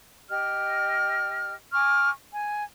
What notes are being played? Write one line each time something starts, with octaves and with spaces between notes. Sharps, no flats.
G4 D#5 F6
G#5 C#6 D6 F6
G#5